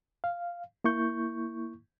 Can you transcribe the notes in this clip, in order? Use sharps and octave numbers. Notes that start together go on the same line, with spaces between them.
F5
A#3 E4 C#6 G6